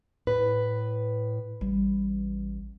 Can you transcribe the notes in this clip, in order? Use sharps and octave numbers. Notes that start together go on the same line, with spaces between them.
A2 B4
A1 G3